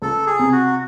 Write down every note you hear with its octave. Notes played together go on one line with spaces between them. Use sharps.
C#2 A4
G#4
C3
F#4